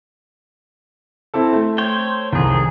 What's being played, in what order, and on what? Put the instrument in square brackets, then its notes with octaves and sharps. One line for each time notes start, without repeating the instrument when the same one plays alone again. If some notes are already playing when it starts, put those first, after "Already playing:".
[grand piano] C4 E4 A4
A3
[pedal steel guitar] C5 C#5 G5
[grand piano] C2 F2 [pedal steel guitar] D#3 G#4